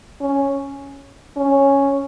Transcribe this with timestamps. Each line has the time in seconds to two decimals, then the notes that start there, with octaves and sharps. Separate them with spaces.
0.21 C#4
1.37 C#4